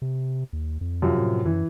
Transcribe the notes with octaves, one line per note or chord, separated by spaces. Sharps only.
C3
D#2
F2
F#2 C3 F3
A2
F#2 E3